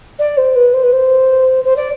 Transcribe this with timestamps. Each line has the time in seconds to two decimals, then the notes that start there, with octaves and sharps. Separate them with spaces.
0.19 D5
0.37 C5
0.55 B4
0.73 C5
0.82 B4
0.92 C5
1.64 C5
1.76 D5